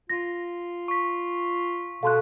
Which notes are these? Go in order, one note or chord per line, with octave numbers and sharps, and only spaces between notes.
F4 A#6
C#6 B6
B2 A4 F5 C6 F#6